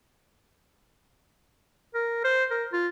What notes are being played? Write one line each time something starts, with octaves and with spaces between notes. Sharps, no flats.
A#4
C5
A#4
F4